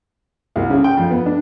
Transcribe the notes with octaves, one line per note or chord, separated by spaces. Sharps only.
C2
C#3
G5
F2
B3
D4